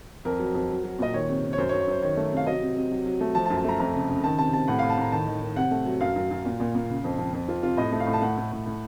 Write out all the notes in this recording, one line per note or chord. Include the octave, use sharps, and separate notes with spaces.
F2 A#4
F#3
F2
F#3
F#3
A#2 D#5
D#3 C#5
C3
C3
C#5
F#2 C5
C#5
F#2
C#5
F#2 C5
D#3 C#5
A3
C3
F5
F#3 D#5
C3
C3
F#3
F#3
A3
F3 A5
A5
F#2
A5
A3 A#5
F2 A#5
C#3
C#3
D#3 A5
C3 A5
C3 A5
A2 F#5
A2 F5
A5
A2 A#5
D#3 A5
D#3
D#3
C3 F#5
A3
F#3
F#2 F5
F#2
F#2
A#2
A#2
A#2
C#3
F2
F2
F2
F2 F4
C3 F4
A2 D#5
A3
F5
A2
A5
A3 F#5
A2
A2
A2